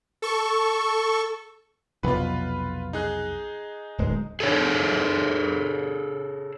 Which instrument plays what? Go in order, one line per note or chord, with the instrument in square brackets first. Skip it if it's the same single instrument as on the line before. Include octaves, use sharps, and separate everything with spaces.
[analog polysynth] A4 C#6
[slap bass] B1 F2 C3 [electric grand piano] F4 B4
[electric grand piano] D#4 G#4 F#6
[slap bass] D1 G#3
[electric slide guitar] G#4 A4 C#5